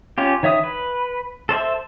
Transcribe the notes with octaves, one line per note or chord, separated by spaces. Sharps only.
C#4 F4 G4
D#3 C#5 E5 D#6
B4
A4 C5 D5 E5